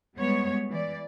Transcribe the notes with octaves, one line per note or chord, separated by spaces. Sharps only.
G3 G#3 B3 C#5
E3 D5